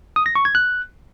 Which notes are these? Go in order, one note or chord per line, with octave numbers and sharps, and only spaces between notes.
D#6
A#6
C#6
G#6
F#6